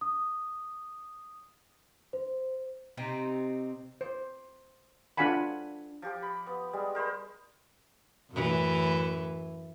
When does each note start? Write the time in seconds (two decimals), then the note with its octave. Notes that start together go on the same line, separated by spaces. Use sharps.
0.01 D#6
2.13 C5
2.97 C3 C4 D#4
4.01 C5
5.17 D4 F4 A4 F#5 G#5 B5
6.02 F3 G4 D6
6.22 B5
6.47 B3
6.73 G3 G#3
6.95 A#4 C5 D#5 B5
8.31 F#2 A2 E3